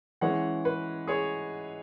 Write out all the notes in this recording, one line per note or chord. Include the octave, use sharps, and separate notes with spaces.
E3 G#3 C#4 C#5 F#5
B4
G#4 C#5